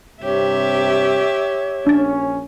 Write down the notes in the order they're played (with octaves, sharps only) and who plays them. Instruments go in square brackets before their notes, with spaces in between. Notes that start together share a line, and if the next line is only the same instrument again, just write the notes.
[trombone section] G2 C3 [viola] G4 E5 [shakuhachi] C#5
[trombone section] A#1 C#4 [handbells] D4 A6